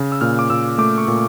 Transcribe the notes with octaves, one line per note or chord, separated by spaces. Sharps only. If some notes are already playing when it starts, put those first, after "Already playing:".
Already playing: C#3
E6
A#2 F6
D6
A#2 E6
A3 D6
C#6
A#2